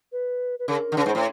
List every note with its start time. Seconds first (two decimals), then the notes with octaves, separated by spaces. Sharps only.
0.12 B4
0.59 B4
0.68 C#3 A#4
0.92 D3
0.97 C#3 B4
1.06 G#2
1.10 A2 C5